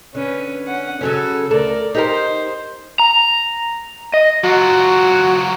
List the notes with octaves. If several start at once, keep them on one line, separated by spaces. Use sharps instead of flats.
D3 C#4 B4
C#4 F#5
C#3 F#3 C#4 A4
D2 A4 A#4 D5
D#4 G4 A#4 C5
A#5
D#5
F#3 F4 F#4